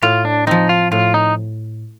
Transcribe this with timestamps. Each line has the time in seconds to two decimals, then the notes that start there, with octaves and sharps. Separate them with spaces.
0.02 A2 F4
0.25 D4
0.47 F3 C4 D#4
0.69 F4
0.92 A2 F4
1.14 D#4